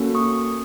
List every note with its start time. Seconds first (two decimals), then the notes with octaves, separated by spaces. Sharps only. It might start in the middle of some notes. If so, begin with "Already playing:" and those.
Already playing: A#3 C#4 F#4 A4
0.15 C#6 D#6